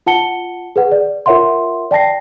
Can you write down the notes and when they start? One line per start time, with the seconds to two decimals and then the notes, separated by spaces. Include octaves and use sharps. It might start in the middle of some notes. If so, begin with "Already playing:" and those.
0.06 F4 F#5 A5 C#7 G7
0.76 G#4 B4 F#5
0.92 D5
1.26 F4 A#4 C#5 E5 F#5 C6
1.91 D5 G5 A5 A#6 C7